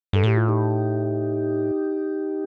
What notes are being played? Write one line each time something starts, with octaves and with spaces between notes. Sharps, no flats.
G2 A4
A2 G4
F4
D#4 G4